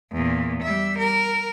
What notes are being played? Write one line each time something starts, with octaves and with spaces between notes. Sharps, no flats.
E2 A#2
G3 E5
A#4